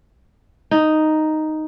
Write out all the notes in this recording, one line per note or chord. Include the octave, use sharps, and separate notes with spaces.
D#4